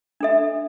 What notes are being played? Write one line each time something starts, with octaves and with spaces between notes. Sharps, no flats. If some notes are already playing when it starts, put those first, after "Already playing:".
D4 A4 E5